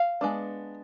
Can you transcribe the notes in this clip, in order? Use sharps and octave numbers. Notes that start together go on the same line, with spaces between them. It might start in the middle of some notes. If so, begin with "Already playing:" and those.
Already playing: F5
G#3 B3 D4